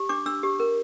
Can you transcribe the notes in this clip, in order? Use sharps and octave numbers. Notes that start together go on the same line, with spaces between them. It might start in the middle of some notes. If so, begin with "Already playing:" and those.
Already playing: G4
D4 D6
D4 E6
G4
A#4